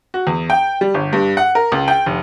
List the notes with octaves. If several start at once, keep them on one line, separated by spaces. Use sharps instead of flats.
F#4
E2
G5
G3
G1
G2
F#5
A#4
C#2
G5
F1